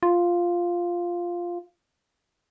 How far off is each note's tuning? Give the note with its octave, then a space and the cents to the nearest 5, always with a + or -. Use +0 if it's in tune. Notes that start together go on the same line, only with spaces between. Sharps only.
F4 +0